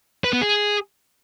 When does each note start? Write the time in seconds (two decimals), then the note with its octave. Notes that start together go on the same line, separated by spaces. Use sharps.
0.24 B4
0.33 B3
0.41 G#4